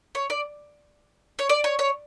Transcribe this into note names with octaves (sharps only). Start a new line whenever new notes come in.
C#5
D5
C#5
D5
C#5
C#5